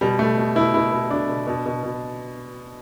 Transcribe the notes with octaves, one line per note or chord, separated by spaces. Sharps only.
B2 G3
B2 A3
B2
B2 E4
B2 E4
B2
B2 D4
B2
B2
B2
B2